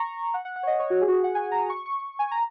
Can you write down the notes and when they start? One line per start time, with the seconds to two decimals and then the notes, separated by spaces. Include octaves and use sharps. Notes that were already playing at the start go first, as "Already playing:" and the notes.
Already playing: A#5 C#6
0.34 F#5
0.45 F#5
0.56 F#5
0.63 C#5
0.67 D#5
0.79 C#5
0.90 F#4
1.01 G#4
1.08 F#4
1.12 G#4
1.24 F#5
1.35 G#5
1.51 A#5
1.70 C#6
1.86 C#6
2.19 G#5
2.31 A#5